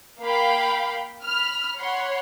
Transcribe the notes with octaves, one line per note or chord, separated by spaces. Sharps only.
A#3 F5 G5 B5
B5 F6
C#5 F#5 B5 C6